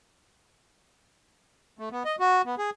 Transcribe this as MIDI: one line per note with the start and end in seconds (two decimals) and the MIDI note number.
1.79 1.89 57
1.92 2.03 59
2.05 2.16 75
2.20 2.42 66
2.46 2.55 59
2.58 2.70 68